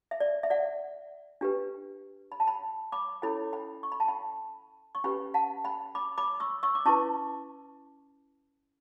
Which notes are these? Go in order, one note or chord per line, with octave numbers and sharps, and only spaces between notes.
E5
D5
E5
D5 F#5
D4 G4 B4
B5
A5
G5 B5
B5 D6
C#4 E4 A4 C#5 G5 B5
G5 B5
C#6
B5
A5
G5 B5
C#6
C#4 G4 B4 G5 B5
F#5 A5
G5 B5
B5 D6
B5 D6
C#6 E6
C#6 E6
D6
C#4 E4 B4 A5 C#6